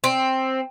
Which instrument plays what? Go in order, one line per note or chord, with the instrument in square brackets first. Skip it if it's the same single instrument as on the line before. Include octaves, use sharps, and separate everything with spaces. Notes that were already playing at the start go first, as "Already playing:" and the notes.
[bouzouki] C4